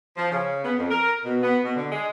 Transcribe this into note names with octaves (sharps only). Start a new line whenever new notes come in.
F3
C#3
B3
F2
A#4
B2
B3
B2
D3
G#3